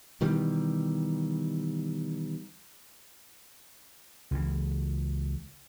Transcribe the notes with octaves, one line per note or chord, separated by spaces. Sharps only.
B2 D#3 E3 G3
C#2 E3